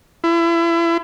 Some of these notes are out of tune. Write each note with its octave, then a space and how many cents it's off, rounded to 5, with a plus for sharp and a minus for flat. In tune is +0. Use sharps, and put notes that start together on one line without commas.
E4 +35